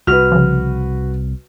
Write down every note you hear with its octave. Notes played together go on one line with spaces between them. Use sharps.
C2 F#4 B4 F6
C#3 F3